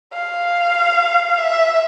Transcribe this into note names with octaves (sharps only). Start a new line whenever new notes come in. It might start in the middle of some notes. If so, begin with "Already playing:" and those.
F5
E5